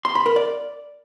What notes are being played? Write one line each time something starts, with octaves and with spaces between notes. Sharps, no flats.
C6
B5
A#4
D5